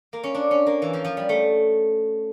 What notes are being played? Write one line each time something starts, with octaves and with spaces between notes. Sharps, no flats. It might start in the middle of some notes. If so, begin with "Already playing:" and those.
A#3
C#4
D4
C#4
A#3
E3
F3
F3
G3
A3